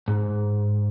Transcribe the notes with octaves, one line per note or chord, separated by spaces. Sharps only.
G#2